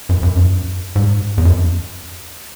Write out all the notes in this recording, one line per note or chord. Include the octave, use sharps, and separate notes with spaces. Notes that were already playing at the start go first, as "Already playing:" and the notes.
F#2
F#2
F#2
G#2
E2
F#2